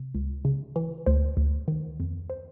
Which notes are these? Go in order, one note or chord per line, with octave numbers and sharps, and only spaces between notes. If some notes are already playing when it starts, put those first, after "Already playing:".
Already playing: C3
C#2
C#3
E3
D2 C5
D2
D#3
F2
C5